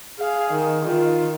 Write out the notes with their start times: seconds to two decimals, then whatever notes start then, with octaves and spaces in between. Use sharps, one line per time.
0.19 G#4 F5
0.51 D#3
0.85 D#3 F4